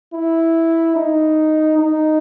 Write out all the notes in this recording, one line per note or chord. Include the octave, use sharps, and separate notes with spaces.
E4
D#4
D#4